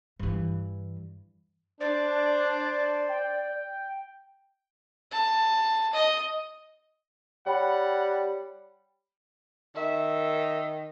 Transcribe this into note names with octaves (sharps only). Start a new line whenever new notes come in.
G2 E3
D4 C5 D5 A6
G5
A5
D#5
G3 C#5 F#5 G5 B5
D#3 E5